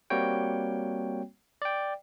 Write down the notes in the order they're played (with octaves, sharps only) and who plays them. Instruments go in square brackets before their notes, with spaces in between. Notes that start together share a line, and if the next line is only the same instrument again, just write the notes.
[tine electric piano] G3 A#3 C4 F#4 C#5 G5
D5 G5